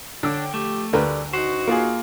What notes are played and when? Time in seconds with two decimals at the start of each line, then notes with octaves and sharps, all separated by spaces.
0.23 D3 D4 C#5 D5 G5 E6
0.54 F3 A3 G4
0.93 D2 G2 D3 A#4 B4
1.33 D4 D#4 F#4 C5
1.67 A#3 F4 G#4